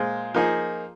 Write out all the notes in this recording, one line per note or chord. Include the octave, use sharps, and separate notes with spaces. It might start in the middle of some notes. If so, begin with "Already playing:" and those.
Already playing: A#2 G#3 F4 C5
F3 A#3 D#4 G#4